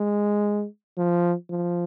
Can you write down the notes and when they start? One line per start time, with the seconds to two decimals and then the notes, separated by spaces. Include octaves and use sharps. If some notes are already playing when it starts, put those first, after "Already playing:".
Already playing: G#3
0.97 F3
1.50 F3